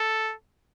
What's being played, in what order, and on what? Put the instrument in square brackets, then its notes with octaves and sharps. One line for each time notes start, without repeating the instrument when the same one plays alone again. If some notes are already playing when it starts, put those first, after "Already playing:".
Already playing: [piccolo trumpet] A4